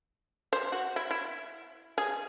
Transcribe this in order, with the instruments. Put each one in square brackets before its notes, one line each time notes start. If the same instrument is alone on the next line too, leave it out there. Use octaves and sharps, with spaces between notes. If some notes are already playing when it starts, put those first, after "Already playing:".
[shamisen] C5
F#4
E4
E4
G#4